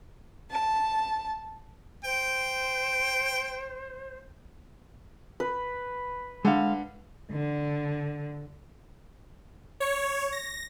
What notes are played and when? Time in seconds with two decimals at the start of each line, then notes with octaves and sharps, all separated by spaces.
0.51 A5
2.04 C5 G5
5.40 B4
6.45 D3 G#3 F5
7.31 D3
9.80 C#5
10.32 A#6